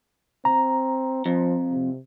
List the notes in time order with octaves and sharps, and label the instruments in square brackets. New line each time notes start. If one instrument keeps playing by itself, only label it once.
[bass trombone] C4 [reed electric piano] A#5
[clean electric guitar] F2 [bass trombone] F3
[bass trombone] C3